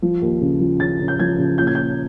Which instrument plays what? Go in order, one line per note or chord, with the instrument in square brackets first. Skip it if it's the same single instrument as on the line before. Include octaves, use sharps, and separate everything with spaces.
[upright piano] F3
D#2
C#3
F3
C#3 A6
C#3
G6
F3 G#6
C#3
A#2 G6
G#6
A#2 G6